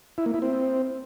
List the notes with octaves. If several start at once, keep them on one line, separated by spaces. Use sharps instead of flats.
E4
A#3
E4
C4